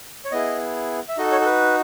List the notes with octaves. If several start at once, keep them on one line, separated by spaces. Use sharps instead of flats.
C#5
B3 E4 G#4 D#5
E5
D#4 F#4 A4 D#5
C#5
A4
B4